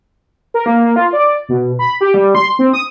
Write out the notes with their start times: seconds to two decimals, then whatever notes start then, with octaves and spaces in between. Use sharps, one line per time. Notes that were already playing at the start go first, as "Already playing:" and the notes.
0.54 A#4
0.66 A#3
0.84 A#3
0.96 F4
1.13 D5
1.49 B2
1.79 B5
2.01 G4
2.14 G3
2.35 C6
2.59 C4
2.73 D#6